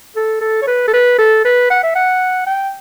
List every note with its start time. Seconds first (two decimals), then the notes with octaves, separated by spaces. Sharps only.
0.16 A4
0.41 A4
0.62 C#5
0.67 B4
0.88 A4
0.93 B4
1.19 A4
1.44 B4
1.70 F#5
1.83 E5
1.95 F#5
2.46 G5